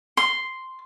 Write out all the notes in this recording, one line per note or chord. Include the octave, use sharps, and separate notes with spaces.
C6